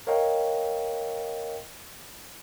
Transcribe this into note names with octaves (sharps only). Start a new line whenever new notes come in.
A#4 C#5 D#5 F5 G5